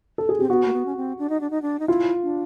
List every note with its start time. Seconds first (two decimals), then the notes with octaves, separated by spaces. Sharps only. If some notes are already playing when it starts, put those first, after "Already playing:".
0.18 A4
0.29 G#4
0.39 C4 G4
0.49 B3 F#4
0.66 A#3
0.73 B3
0.86 C#4
0.97 C4
1.19 D4
1.30 D#4
1.41 D4
1.50 D#4
1.62 D4
1.80 D#4
1.88 E4 F4
2.23 D4